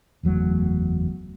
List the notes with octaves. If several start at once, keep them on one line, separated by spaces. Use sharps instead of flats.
F#1 E2 F#3 A3